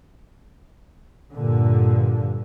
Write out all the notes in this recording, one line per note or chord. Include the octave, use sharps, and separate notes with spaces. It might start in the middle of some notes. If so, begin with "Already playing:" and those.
G2 A#2 D3